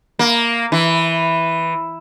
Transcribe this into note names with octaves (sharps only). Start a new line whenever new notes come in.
A#3
E3